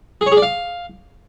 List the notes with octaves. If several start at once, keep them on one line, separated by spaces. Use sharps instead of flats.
G#4
C#5
G#4
D5
F5